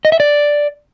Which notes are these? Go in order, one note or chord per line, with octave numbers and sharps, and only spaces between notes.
D#5
E5
D5